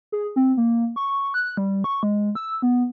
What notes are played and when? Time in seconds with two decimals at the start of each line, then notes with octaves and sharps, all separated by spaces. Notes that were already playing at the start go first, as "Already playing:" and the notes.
0.12 G#4
0.36 C4
0.57 A#3
0.96 C#6
1.34 F#6
1.57 G3
1.84 C#6
2.03 G#3
2.35 E6
2.62 B3